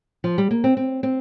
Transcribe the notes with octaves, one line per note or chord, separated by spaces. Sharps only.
F3
G3
A#3
C4
C4
C4